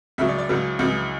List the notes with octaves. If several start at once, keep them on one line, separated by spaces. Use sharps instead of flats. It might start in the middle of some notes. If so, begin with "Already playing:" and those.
C#2 C#3 F#3 E5
D5
D5
C#2 C#3 F#3
C#2 C#3 F#3